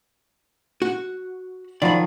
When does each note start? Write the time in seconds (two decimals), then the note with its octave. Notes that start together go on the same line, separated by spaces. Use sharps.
0.82 F#4
1.82 D#3 F3 F#3 D5 B5